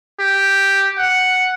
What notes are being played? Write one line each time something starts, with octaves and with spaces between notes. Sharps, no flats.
G4
F#5